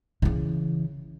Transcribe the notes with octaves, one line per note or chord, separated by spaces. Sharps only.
C#3 E3